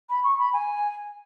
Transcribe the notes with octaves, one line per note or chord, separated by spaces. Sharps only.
B5
C#6
B5
G#5